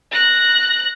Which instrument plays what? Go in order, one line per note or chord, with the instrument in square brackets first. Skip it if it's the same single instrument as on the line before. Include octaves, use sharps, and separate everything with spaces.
[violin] F#6 A#6